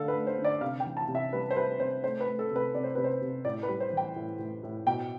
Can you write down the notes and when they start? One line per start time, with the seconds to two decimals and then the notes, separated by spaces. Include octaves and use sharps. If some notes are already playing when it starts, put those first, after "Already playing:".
Already playing: D3 A3 A4 F5
0.08 B4
0.14 A3
0.27 C5
0.39 D3
0.44 D5
0.61 C3 F5
0.80 G5
0.86 E3
0.97 A5
1.08 C3
1.15 E5
1.33 G3 B4
1.51 C5
1.56 G3 B4
1.79 C3 C5
2.04 A3 C5
2.21 B4
2.27 A3
2.39 A4
2.51 C3
2.56 B4
2.74 C3 D5
2.84 C5
2.95 C3 B4
3.04 C5
3.22 C3
3.45 A2 D5
3.63 B4
3.68 G3
3.80 C5
3.92 E3 G5
4.16 A2
4.39 A2
4.63 A2
4.86 B2 G5